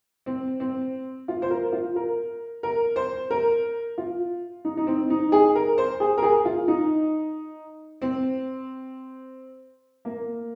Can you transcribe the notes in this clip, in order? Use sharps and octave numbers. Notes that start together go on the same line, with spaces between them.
C4
C4
F4
C5
A#4
F4
A#4
A#4
C5
A#4
F4
D#4
D#4
C4
D#4
G#4
A#4
C5
G#4
A#4
G#4
F4
D#4
C4
A#3